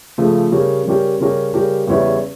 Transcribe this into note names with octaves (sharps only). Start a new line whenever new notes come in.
C#3 F3 A3
C#3 G3 C#4 G4 A#4
C#3 G3 C#4 G4 A#4
C#3 G3 C#4 G4 A#4
C#3 G3 C#4 G4 A#4
E2 C#3 G3 C#4 E4